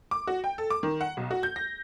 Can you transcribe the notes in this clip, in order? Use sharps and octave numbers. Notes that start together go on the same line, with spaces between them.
D6
F#4
G5
A4
D6
D#3
F#5
B1
F#4
G6
A#6